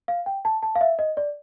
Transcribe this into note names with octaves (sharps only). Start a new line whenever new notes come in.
F5
G5
A5
A5
F5
E5
D#5
D5